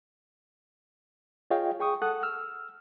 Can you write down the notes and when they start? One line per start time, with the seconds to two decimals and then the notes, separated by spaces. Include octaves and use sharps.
1.51 F4 G#4 C#5 D#5 F5 G5
1.80 G#4 G5 C#6 D#6
2.02 A4 F#5 D#6 F#6
2.23 E6 F6